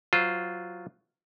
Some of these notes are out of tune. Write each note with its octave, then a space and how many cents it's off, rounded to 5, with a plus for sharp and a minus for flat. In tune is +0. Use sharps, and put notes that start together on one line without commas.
F#3 +0 F4 +0 C5 -20